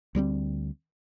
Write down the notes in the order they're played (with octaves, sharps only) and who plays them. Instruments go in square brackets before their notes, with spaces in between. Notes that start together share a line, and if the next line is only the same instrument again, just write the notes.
[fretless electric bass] D2 G3 B3 C4